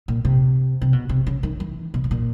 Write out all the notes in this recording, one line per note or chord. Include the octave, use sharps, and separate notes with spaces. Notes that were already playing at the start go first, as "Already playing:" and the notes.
A#2
C3
C3
B2
C3
C#3
D#3
E3
B2
B2
A#2